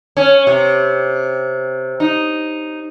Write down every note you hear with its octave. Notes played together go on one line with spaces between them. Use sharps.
C#4
C3
D#4